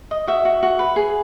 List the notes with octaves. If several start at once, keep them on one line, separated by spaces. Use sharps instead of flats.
D#5
F#4 E5
F#4
F#4
B4
G#4